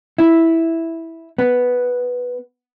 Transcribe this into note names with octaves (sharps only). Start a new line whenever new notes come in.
E4
B3